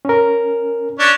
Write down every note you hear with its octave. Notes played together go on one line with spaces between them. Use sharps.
C#4 A#4
C#4 D4